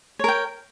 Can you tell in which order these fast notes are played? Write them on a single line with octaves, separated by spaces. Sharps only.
C#5 A#4 G5